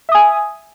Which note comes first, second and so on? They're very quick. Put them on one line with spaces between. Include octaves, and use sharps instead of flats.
E5 D#6 G#5